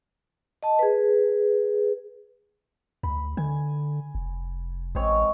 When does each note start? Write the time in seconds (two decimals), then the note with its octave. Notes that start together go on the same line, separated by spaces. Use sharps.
0.63 D#5 A5
0.79 G#4 B4
3.03 D2 B5
3.37 D3 G#5
4.15 F1
4.95 A1 G#3 C4 C#5